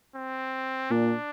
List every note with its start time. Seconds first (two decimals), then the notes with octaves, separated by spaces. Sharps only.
0.15 C4
0.91 A#2 D4